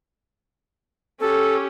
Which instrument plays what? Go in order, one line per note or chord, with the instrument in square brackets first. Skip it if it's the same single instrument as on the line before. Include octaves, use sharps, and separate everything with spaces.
[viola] C#4 G4 [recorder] A4